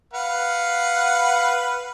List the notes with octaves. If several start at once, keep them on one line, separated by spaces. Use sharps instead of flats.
B4 F5 F#5